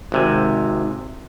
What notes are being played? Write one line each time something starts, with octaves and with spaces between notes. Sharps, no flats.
G#1 C3 G#5